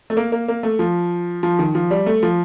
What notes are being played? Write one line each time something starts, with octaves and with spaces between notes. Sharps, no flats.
A3
A#3
A#3
A#3
A3
F3
F3
D#3
F3
G3
A3
F3